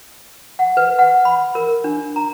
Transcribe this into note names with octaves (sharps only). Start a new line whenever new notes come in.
F#5
B4
F#5
B5
A#4
D4
A#5